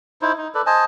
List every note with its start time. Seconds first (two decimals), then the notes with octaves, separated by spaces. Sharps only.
0.22 D#4 E4 C5
0.37 D#4
0.55 A4 B4 D5
0.66 C5 D#5 G#5 A5